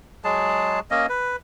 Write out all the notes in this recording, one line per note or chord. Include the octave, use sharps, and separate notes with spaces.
F#3 G#3 G#4 A5
A#3 C#4 D#5
B4